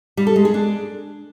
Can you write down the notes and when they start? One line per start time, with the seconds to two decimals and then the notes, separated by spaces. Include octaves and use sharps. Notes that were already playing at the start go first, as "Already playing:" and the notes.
0.17 G3
0.27 A4
0.36 G#3
0.45 G#4
0.54 D4